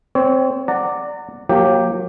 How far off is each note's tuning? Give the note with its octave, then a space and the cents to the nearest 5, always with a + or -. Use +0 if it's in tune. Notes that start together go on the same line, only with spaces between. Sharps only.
C4 +0 C#5 +25
D5 +0 F#5 +0 A#5 -30
F#3 -35 A#3 +0 G4 +0